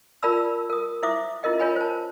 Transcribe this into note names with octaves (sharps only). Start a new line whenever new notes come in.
F4 A#4 D5 A5 B5 E6
A#4 D#6
E4 C5 E5 D6 D#6
C#4 E4 F4 A#4 D#5 G5
F4 A#4 C#5 G5 G#5 B5
C5 A5